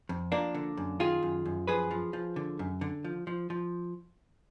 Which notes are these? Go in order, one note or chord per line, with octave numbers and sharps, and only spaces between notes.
F2
F3 A#3 D4
D3
F#2
D#3 F4 G#4
F#2
F#2
F3 G#4 B4
F3
F3
D3
F#2
D3
F3
F3
F3